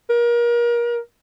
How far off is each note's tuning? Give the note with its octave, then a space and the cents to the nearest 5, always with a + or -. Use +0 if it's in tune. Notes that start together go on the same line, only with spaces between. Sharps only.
A#4 +30